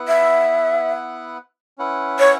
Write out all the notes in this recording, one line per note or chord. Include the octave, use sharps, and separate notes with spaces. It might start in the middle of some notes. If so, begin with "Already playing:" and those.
Already playing: B3 E4 B4 F#5
E5
C#4 E4 B4 F#5
C#5